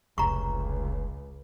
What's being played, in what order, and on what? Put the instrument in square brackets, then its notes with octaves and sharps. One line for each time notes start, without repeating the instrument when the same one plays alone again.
[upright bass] F1 [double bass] C#2 [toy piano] A#5 C#6